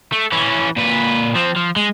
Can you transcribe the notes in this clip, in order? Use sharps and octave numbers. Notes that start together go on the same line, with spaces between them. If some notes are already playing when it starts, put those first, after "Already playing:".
A3
E3 C#4
A#2 B4
F3 C4
F3
G#3